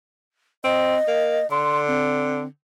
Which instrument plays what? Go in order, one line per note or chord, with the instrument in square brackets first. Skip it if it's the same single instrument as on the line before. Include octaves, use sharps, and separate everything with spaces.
[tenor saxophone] C4 [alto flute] D#5
[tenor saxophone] A#3
[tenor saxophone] D3 [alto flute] C6
[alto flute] C4